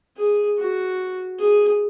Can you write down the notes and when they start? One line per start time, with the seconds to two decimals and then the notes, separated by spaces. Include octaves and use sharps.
0.17 G#4
0.57 F#4
1.39 G#4